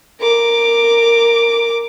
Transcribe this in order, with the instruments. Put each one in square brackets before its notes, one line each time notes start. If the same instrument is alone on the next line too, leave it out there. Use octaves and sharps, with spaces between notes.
[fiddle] A#4 D6